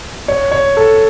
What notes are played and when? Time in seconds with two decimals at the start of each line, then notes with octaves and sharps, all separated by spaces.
0.28 C#5
0.52 C#5
0.77 A4